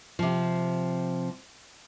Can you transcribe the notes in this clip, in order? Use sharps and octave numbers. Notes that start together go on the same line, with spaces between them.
C3 F3